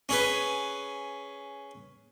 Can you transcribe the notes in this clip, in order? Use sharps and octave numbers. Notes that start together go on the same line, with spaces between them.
C#4 G#4 B4